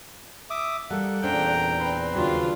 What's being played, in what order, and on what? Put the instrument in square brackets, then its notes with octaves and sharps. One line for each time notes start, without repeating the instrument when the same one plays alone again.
[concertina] E5 D6 D#6
[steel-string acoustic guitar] G3 [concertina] A#3 A4 F#5
[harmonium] E2 A#2 [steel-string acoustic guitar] C#4 D4 C5 [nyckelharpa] G5 A#5
[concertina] C4 B4 C6
[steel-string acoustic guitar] D#2 C#3 F#3 [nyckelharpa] D4 F4